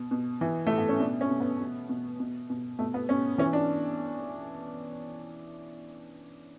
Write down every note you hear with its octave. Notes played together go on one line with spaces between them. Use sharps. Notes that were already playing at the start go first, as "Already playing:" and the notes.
Already playing: B2
B2
E3
A2 A3
B3
C#4
B2 D4
C#4
B2
B3
B2
B2
B2
B2
B2 A3
B3
B2 C#4
E3 C#4
D4